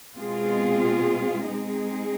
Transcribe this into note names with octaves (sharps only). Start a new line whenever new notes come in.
B2 G#3 C4 F4 G#4
G#3 C4 D#4 G#4